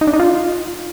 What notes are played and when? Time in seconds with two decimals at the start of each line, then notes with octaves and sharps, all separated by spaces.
0.01 D#4
0.07 D4
0.13 D#4
0.19 F4